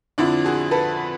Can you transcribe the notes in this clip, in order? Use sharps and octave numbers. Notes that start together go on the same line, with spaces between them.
F2 D3 F3 D4 E4
F#4 G#4
A4 B4